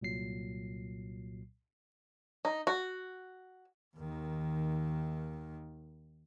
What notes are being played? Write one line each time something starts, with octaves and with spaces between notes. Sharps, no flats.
C2 A#2 F#3 C7
D#4
F#4
D#2 D#3